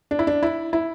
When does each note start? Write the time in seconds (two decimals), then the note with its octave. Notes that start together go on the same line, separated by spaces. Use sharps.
0.11 D4
0.19 E4
0.27 D4
0.43 E4
0.73 E4